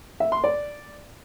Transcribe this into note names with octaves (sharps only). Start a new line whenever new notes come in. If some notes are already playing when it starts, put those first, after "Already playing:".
E5
C6
D5